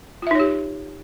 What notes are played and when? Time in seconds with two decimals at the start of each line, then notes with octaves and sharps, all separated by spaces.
0.22 F4
0.27 E5
0.31 D#4
0.35 C#5
0.40 G4